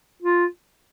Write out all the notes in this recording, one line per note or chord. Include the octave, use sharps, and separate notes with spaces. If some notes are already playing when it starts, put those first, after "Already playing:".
F4